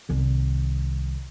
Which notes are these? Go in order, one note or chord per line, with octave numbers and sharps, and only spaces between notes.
C2 D#3